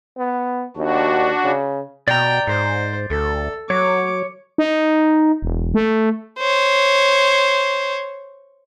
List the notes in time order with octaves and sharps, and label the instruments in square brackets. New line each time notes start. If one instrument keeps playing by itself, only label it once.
[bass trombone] B3
[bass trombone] D#2 [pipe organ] D4 F#4
[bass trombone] C#3
[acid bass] B2 [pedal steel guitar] D5 A#5 [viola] G5
[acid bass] G#2 [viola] C5
[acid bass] D2 [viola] A4
[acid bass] F#3 [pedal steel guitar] C#5 [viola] D6
[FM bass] D#4
E1
A3
[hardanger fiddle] C5 C#5